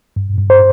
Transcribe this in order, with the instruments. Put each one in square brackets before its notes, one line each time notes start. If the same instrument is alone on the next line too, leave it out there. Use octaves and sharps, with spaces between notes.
[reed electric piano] G2
G2
C5